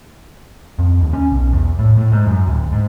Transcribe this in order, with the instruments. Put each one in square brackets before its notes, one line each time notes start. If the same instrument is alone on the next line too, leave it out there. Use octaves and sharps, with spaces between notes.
[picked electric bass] F2
D#2
C#4
B1
E2
A2
A2
G#2
F#2
D1
G#2